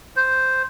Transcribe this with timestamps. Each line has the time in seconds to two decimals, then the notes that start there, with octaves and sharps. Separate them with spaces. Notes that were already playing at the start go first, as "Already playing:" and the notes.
0.16 C5